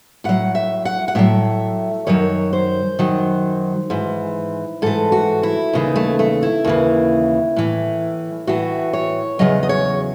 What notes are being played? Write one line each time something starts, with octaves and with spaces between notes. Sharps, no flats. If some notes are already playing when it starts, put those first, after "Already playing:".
A2 F#3 F#5
E5
F#5
F#5
A2 F#3 E5
F#2 D#3 F#3 C#5
C5
F#2 D#3 F#3
G#2 E3
G#2 E3 A4
F#4
E4
D#2 C#3 E3 D#4
A3
A3
E4
D#2 C#3 E3
A2 E3
A2 E3 F#4
C#5
E2 C#3 F#3 D#5
D#5
C#5